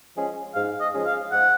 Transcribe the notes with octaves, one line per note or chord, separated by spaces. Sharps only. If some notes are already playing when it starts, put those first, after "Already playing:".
F3 G#3 C#4 G#4
G#2 F5
D#5
F3 G#3 C#4 G#4
F5
G#2 F#5